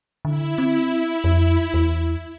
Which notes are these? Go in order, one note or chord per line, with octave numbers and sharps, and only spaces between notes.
D3 E4
C4
F2
E2